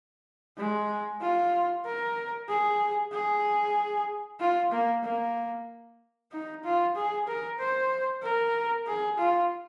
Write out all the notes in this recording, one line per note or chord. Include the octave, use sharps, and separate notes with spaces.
G#3
F4
A#4
G#4
G#4
F4
A#3
A#3
D#4
F4
G#4
A#4
C5
A#4
G#4
F4